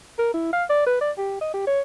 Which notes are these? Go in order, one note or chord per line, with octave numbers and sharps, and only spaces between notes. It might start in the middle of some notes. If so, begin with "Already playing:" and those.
A#4
E4
F5
D5
B4
D5
G4
D#5
G4
C#5